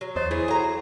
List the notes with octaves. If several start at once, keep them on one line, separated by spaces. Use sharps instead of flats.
F#3
E2 C5 C#5 D#5 D#6
E3 E4 G#4
F#3 A4 F#5 A#5